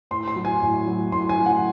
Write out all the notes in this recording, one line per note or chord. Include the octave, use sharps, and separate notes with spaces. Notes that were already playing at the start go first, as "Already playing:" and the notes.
A2 C6
C6
F#3
G#5
A2
F#3
A2 C6
G#5
F#3
F#5